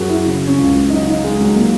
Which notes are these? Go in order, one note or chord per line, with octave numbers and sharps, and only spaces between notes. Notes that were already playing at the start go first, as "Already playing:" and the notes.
Already playing: F#2 F#3 F#4 G#4 A#4
E4
C#3
C#4
C#2
F#3 D#4
D#4
F#3 G#3
F#3
F#3 A#3